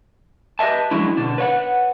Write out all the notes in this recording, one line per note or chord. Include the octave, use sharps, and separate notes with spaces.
G4 B4 D#5 E5 A5
F3 F#3 G#3 C#4 D4 E4
B2 D3 D4
B4 C#5 F#5